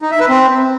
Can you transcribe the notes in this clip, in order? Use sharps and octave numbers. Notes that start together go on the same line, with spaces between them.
D#4
E5
B4
C4